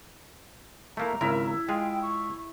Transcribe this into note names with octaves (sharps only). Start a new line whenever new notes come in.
A3 A#3 E4 A#5
G#1 C#3 E4 A#4 E5
G#3 F4 G#4 G5
C#6